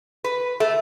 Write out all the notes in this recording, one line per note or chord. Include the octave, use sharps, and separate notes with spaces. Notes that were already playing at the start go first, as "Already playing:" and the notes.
B4
A3